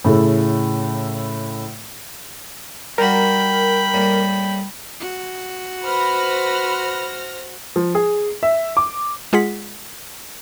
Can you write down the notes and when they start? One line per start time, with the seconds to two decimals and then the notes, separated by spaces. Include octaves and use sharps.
0.04 A2 C#3 E4 A4
2.98 G3 F#4 A#4 G5 B5
3.94 A2 G3 A#3
5.00 F#4
5.85 B4 C5 B5 F6 A#6
7.76 F3
7.95 G#4
8.43 E5
8.77 D6
9.33 G#3 F4 G#4 F#5 B6